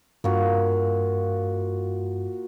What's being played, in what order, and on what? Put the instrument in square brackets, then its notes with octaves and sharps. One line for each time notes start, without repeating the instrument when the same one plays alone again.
[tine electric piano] G2 [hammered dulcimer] A#3 F4 F#4